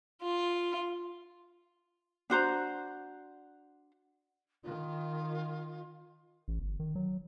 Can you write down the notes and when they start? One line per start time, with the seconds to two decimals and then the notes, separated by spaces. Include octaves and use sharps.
0.24 F4
2.30 D4 F#4 C5 A#5
4.63 D#3 F4
6.48 A1
6.59 G1
6.80 D#3
6.95 F#3